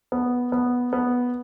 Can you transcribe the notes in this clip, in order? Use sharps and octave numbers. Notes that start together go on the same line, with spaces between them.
B3
B3
B3